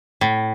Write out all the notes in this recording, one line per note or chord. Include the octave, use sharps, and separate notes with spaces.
A2